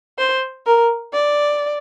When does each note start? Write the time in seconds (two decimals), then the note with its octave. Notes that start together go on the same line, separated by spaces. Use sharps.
0.19 C5
0.66 A#4
1.13 D5